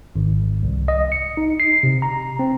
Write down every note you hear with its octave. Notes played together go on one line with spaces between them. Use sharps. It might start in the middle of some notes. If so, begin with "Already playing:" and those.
G#1
C2
D#5
C#7
D#4
C7
C3
A#5
C4